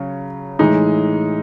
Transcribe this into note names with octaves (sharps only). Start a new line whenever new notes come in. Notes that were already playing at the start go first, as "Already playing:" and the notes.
Already playing: C#3 F#3 C#4
A2 E3 G#3 D#4